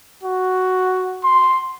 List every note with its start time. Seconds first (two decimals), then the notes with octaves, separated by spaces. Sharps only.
0.23 F#4
1.24 C6